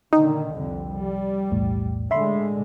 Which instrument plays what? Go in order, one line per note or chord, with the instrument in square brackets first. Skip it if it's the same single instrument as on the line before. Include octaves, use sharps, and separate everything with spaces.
[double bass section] A#2 D3 D#3 [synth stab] D#4 [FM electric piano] G5
[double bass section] C2 F2 D3
G3
[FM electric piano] B1 E2 A2
[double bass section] A2 D3 G#3 [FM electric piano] E5 B5 C6